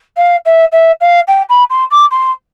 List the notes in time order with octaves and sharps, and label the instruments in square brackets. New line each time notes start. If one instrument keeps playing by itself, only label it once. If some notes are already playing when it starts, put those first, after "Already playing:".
[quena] F5
E5
E5
F5
G5
B5
C6
D6
C6